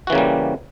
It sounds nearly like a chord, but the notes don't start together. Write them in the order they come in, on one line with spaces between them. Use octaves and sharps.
F#4 E3 C#3 A#3 G3